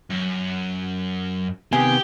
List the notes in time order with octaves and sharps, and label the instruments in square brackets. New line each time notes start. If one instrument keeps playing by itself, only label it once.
[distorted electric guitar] F#2
[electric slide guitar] C3 D#3 B3 [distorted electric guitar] G4 G5 [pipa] G#4